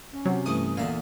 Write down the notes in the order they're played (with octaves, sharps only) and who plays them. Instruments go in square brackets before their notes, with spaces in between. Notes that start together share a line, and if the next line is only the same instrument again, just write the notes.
[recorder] C#4
[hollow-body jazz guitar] C3 [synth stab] F#3
[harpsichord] G2 E3 A3 [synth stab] D#6
[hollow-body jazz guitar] E2 A#2 [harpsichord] D3 E5 F5